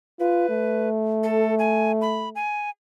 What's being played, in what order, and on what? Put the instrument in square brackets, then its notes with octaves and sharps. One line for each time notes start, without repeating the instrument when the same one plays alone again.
[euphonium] F4 [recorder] B4
[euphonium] A3
[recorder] A4
G#5
B5
G#5